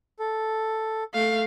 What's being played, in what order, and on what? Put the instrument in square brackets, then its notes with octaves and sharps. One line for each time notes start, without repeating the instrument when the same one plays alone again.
[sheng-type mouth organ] A4
[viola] A3 F5